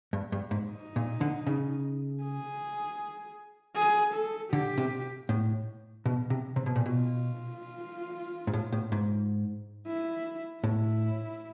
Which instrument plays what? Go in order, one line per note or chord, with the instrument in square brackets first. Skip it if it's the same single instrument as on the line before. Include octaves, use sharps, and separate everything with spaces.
[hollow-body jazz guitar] G2
G2
G#2
[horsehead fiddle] D#4
[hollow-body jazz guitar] A#2
D3
C#3
[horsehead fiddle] G#4
G#4
A4
[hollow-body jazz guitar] D3 [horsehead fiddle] G4
[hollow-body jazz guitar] C3
A2
B2
C3
C3
B2
A#2
[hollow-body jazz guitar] B2 [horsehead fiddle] F4
[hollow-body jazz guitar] G#2
A2
A2
G#2
[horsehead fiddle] E4
[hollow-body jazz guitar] A2 [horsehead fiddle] E4